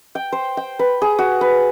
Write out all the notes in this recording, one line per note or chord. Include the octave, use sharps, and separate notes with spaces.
G5
C5
G5
B4
G#4
F#4
B4